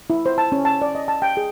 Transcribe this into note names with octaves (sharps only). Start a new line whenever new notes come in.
E4
C5
A5
C#4
A5
D5
D#5
A5
G5
G#4